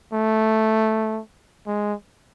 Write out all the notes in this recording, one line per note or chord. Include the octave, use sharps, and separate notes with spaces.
A3
G#3